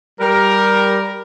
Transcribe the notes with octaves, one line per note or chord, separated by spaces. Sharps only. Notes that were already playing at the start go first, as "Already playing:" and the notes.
G3 A#4